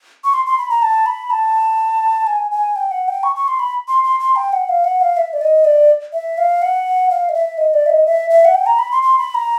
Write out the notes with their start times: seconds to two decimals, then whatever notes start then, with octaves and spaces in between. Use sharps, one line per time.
0.24 C#6
0.34 C6
0.46 C6
0.58 B5
0.70 A#5
0.82 A5
1.06 B5
1.30 A5
2.27 G#5
2.51 G#5
2.76 G5
2.91 F#5
3.08 G5
3.23 C#6
3.36 C#6
3.48 C6
3.59 B5
3.88 C6
4.04 C6
4.20 C6
4.36 G5
4.53 F#5
4.69 F5
4.84 F#5
5.01 F5
5.17 E5
5.33 D5
5.41 D#5
5.65 D5
6.13 E5
6.38 F5
6.62 F#5
7.10 F5
7.29 D#5
7.34 E5
7.58 D#5
7.74 D5
7.86 E5
7.90 D#5
8.06 E5
8.30 E5
8.45 F#5
8.54 G5
8.66 A#5
8.79 B5
8.91 C6
9.02 C6
9.18 B5
9.35 A#5